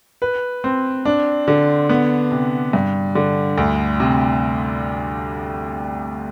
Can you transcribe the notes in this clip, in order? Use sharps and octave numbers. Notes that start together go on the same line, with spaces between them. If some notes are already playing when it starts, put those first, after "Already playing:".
B4
C4
D4
D3
B3
C3
G2
D3
D2
C3